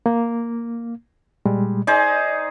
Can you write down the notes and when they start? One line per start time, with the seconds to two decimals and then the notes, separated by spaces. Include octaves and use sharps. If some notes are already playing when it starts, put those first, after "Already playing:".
0.06 A#3
1.46 A#2 G3 G#3
1.87 D#4 G#4 C5 D5